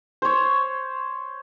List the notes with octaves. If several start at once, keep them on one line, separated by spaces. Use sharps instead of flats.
C5 C#5